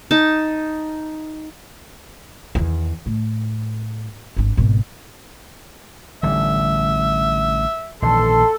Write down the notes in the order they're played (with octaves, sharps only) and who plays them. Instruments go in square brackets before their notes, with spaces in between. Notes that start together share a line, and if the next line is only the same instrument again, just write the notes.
[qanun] D#4 A5
[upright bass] E2 D#3
A2
G#1 D4
G#1 B2
[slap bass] A1 D3 G3 [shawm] E5
[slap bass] A#1 D#3 E3 [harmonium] A4 [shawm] C6